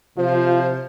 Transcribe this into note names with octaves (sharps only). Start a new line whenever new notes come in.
C3 F3 F4 C5